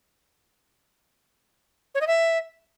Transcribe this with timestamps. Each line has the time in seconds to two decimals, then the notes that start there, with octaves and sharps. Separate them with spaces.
1.95 C#5
2.01 D#5
2.07 E5